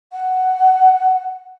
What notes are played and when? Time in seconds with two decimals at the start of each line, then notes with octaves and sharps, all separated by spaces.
0.12 F#5